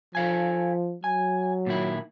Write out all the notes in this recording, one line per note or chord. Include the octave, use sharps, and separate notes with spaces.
F3 A4 F5 G#5
F#3 G#5
A#2 D#3 E4